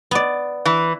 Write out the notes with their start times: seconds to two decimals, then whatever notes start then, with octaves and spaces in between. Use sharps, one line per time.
0.11 B3 D5
0.65 E3